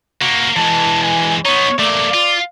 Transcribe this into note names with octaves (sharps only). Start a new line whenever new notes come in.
A#3 F#4
E3 G#3 A5
G#5
B3 D#4 C#5
A3 A#3 D5
F4